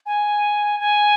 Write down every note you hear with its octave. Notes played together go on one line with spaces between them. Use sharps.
G#5
G#5